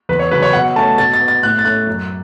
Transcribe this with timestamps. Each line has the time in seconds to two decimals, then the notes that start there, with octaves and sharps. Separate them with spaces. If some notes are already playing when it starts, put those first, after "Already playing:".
0.09 E2 B4
0.19 C#5
0.31 C#3 F#3 C#4 B4
0.42 C#5
0.53 B2 F#5
0.76 A3 C#4 A5
0.97 B2 A6
1.14 A6
1.20 B3
1.28 A6
1.43 A2 F#6
1.59 A6
1.65 A3 C#4 F#6
1.87 F#2